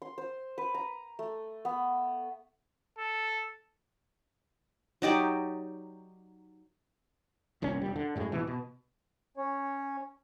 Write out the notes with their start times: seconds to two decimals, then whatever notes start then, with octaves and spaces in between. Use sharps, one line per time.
0.02 C6
0.18 C5
0.58 B4
0.74 A#5
1.19 A3
1.65 B3
2.98 A4
5.02 F#3 D#4 G4 D5
7.62 G1 C2 A#2 C#4
7.81 E1 G3
7.96 D3
8.16 F#2 A2 G#3
8.32 D1 B2 E3
8.47 B2
9.37 C#4 C#5